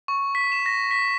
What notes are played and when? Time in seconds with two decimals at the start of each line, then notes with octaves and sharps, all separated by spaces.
0.08 C#6
0.35 B6
0.52 E7
0.66 A#6
0.91 B6